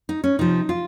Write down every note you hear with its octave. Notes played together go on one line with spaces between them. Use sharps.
D#4
C#4
C3 F3 D#4
F4